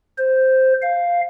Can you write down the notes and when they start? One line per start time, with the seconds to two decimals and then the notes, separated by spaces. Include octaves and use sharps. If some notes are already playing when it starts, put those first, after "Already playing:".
0.18 C5
0.82 F5